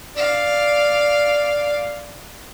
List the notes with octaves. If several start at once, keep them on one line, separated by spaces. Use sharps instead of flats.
D5 F5